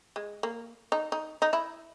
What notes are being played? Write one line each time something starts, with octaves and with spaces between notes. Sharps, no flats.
G#3
A#3
D#4
D#4
D#4
E4